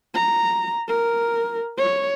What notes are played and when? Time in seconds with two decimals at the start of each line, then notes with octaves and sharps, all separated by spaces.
0.14 A#5
0.88 A#4
1.78 C#5